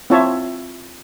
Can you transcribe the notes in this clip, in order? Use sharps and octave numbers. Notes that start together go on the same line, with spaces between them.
C4 E4 F4 C#5 E5 A5